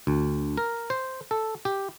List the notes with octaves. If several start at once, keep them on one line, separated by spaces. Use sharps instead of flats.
D2
A#4
C5
A4
G4